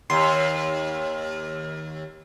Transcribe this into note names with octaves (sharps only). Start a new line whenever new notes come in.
D#2 C6